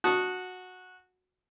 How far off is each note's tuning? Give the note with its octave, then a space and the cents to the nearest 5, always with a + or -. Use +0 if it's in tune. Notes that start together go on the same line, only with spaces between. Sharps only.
F#4 -10 A5 +0 D#6 +0